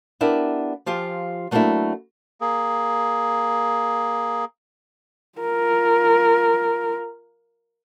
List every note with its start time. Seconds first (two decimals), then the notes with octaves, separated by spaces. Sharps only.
0.21 B3 D4 E4 G4 A#4
0.86 F3 F4 G4 G#5
1.51 F#3 A3 A#3 C4 D4 E4
2.41 A#3 G#4
5.39 F4 A#4